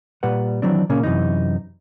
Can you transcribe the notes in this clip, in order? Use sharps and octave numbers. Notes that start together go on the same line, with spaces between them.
A#2 G3 B4 F#5
D#3 E3 F#3 C4 D4
A#2 C#3 A#3 C#4
F#2 C3 E3 D#4